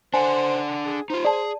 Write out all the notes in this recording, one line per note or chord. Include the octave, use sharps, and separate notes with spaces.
D4 C5 F#5 G#5
G#4
D#4 F4 C5
G#4 D5 A5